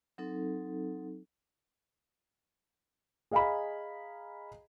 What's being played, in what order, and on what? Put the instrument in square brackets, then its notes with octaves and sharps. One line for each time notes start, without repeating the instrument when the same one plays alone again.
[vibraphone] F#3 C4 D#4 A4
[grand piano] G#4 D#5 F5 G#5 A#5 B5